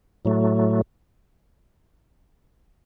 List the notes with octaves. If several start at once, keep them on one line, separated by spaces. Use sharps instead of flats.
A2 F#3 A3